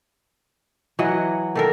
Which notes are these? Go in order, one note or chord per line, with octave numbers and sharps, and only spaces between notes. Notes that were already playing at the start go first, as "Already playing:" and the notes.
E3 F#3 D#5 F#5
D#3 A4 A#4